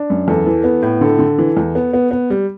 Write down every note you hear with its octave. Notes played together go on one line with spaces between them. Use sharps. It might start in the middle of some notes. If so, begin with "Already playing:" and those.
Already playing: D4
F#2
E2 A4
E3
B3
A2
D3 A4
D3
E3
E2
B3
B3
B3
G3